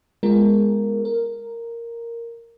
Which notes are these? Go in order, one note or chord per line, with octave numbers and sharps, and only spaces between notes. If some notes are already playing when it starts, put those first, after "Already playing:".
G#3 B3 F4 G#4 A#4
A#4